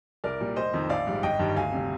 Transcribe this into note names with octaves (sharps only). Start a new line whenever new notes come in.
C2 A#4 D5
A#2 G3
F1 C5 D#5
F2 D#3
A#1 D5 F5
G#2 G3
G1 D#5 G5
G2 D#3 G3
D2 F5 G#5
C3 G3